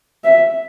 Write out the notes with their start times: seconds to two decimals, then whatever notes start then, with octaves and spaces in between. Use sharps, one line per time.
0.24 E5